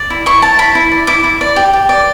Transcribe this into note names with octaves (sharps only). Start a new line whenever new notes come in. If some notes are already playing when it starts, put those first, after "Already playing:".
Already playing: D5
E4
E4 C#6
C#5 A5
E4 B5
E4
D5
E4 D6
E4
D5
G4
G4
D5